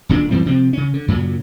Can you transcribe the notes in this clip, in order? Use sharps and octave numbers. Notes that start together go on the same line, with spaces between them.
D#1 A#2 B3 D4
F#2 E3 G3 C4
C3 F3 C4
C#3 C#4
D3
F#2 A#2 C#3 F#3